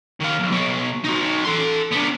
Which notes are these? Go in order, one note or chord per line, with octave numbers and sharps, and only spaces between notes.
D#3 F5
B1
B2 C#5
D#4 F#4
A4 C6
B3 D4